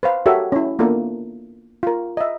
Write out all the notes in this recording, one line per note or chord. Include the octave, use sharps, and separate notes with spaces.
B4 C5 F5
F#4 G4 A4 A#4 C#5 E5
C#4 E4
A#3 B3 D4 F4 A4 A#4
F4 A#4
D#5 E5